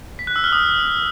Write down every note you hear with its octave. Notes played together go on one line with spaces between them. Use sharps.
B6
F#6
E6
F6
D#6